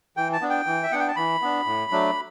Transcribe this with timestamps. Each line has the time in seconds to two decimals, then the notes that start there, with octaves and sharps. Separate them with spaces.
0.17 E3 G5
0.33 A5
0.41 B3 D4
0.50 G5
0.66 E3
0.83 E5
0.91 B3 D4 F#5
0.99 G5
1.08 A5
1.16 E3 B5
1.42 B3 D4
1.66 A2
1.91 F#3 A3 D4